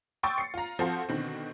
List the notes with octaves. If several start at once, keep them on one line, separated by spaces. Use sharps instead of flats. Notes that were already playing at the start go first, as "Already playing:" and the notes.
G5 C6 C#6 D#6 E6 A6
C7 C#7
F4 A#5
F3 C4 F4 F#4 A4 C5
B2 D3 D#3 C4